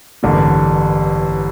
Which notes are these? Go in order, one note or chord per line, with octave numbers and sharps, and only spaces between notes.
A1 G2 D3 G3 A#3